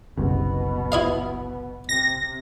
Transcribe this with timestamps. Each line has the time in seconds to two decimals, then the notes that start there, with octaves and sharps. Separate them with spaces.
0.17 F#1 C2 B2 B3
0.92 E4 D#5 F5
1.89 C3 A#6